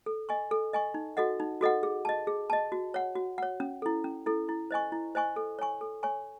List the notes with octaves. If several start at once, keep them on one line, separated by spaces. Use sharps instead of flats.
A4
D#5 G#5 C#6
A4
D#5 G#5 C#6
D#4
F#4 A4 D#5 F#5
D#4
F#4 A4 D#5 F#5
G#4
D#5 A5
G#4
D#5 A5
F#4
C#5 F#5
F#4
C#5 F#5
C#4
E4 A4
C#4
E4 A4
E4
C5 D#5 G#5 C#6
E4
C5 D#5 G#5 C#6
A4
C#5 G#5 C#6
A4
C#5 G#5 C#6